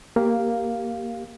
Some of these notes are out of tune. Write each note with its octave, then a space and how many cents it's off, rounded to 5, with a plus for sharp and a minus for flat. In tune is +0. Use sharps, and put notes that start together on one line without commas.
A#3 +0 G4 +0 F5 +0